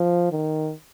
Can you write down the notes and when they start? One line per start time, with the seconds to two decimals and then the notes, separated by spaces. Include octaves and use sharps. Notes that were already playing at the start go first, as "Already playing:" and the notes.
Already playing: F3
0.32 D#3